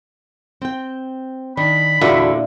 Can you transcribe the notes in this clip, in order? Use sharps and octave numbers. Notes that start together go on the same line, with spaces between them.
C4 G5
D#3 D4 B5
E2 A#2 D3 E4 F#4 G#4